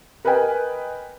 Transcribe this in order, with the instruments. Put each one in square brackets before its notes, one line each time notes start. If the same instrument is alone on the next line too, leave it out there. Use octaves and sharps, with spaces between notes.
[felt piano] A#4 B4 D#5 G5 G#5